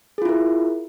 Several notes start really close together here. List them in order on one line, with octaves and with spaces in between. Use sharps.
G#4 F4 E4 A#4